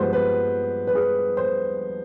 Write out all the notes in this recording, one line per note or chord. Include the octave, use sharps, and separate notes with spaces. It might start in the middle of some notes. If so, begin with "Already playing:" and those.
Already playing: G2 F3 G#3 B3 G4 B4 C5
B4
B4
G#4
C5